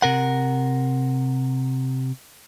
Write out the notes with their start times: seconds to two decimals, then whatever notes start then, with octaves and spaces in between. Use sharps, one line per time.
0.02 C3 A#4 F#5